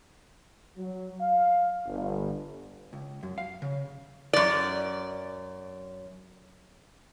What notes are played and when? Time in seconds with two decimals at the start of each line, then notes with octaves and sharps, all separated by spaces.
0.78 F#3
1.21 F5
1.86 G1
2.93 C#2
3.23 F#2
3.38 F5
3.62 C#3
4.33 F#2 D5